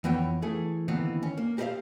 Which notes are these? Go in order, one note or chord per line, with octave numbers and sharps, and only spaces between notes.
F2 E3 B3 C#5 G5
E3 A3 G#4
D#2 D3 E3 B3 C4
C#4
A#3
G4 A#4 C5 D5 E5 F5